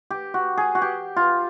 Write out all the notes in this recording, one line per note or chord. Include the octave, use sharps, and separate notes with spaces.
G4
F#4
G#4
F#4
G4
F4